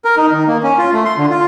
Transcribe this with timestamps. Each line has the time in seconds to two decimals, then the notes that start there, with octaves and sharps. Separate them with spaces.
0.05 A#4
0.17 D#4
0.32 D#3
0.47 A#3
0.63 C#4
0.78 F4
0.93 A3
1.05 C6
1.18 D3
1.30 F4